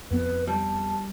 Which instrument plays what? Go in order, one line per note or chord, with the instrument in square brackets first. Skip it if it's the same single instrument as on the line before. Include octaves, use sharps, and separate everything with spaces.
[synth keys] F2 B3 [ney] B4
[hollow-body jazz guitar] G3 [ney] A5